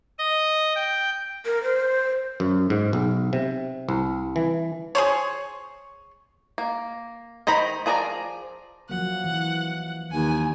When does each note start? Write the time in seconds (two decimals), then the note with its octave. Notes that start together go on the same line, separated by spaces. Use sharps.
0.19 D#5
0.75 G5
1.46 A#4
1.63 C5
2.40 F#2
2.70 G#2
2.93 B1
3.33 C3
3.89 C2
4.36 E3
4.95 G#4 C5 C#5
6.58 A#3
7.47 D#3 C5 A#5 B5
7.86 F3 G#4 A#4 D5 A#5
8.90 F3 F#3 A#3 F#5
9.24 E3
10.12 D#2 G#5